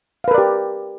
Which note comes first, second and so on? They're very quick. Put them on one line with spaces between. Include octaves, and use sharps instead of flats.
F5 B4 A#4 D5 G4